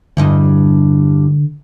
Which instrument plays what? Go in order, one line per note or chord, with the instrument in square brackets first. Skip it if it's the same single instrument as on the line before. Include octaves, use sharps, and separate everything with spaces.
[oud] E2 G2 D#5 [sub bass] D3